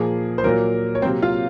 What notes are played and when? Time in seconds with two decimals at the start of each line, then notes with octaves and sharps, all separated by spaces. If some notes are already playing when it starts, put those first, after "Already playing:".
Already playing: A#2 F3 A#3 G#4
0.38 C5
0.44 A#2 F#3 A#3 A#4
0.95 C#5
1.02 C3 F#3 A#3 C4 C5
1.22 F4 F5